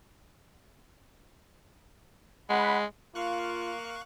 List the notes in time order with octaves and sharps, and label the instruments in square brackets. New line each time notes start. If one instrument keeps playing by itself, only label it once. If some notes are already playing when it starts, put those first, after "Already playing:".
[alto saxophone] G#3 [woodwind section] F#5 B5
[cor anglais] A#3 [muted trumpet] F4 [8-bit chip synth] F5 C#6 F#6